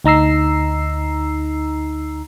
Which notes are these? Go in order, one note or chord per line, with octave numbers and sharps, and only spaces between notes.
D2 D#4 A#5 E6 C7